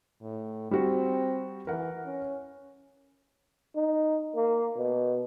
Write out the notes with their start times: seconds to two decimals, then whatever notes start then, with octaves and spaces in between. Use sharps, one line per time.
0.22 A2
0.71 G3 C4 F#4
1.67 E3 A#4 F#5
2.05 C#4
3.76 D#4
4.36 A#3
4.77 B2